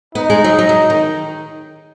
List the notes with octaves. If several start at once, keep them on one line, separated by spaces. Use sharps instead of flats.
B3 D#4
G#3
F#3
F#3
F#3
D#3